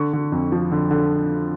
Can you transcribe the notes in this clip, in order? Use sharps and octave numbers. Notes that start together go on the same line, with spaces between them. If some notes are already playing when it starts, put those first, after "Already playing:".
Already playing: D3 C#6
D3
F2
F3
D3
D3